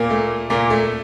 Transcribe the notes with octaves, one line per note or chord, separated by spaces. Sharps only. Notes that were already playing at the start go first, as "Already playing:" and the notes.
Already playing: A#2 A#3
A3
A#2 A#3
A3